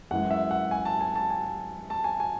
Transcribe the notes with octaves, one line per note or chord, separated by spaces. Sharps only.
F#2 E3 G#3 F#5
E5
F#5
G#5
A5
G#5
A5
G#5
A5
G#5
G#5